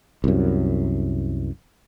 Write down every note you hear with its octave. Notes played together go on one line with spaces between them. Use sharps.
C2 F#2